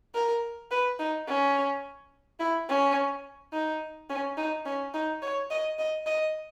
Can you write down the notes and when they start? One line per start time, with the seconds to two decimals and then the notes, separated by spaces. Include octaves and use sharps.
0.15 A#4
0.71 B4
0.99 D#4
1.28 C#4
2.40 E4
2.69 C#4
3.53 D#4
4.10 C#4
4.38 D#4
4.65 C#4
4.94 D#4
5.22 C#5
5.51 D#5
5.79 D#5
6.06 D#5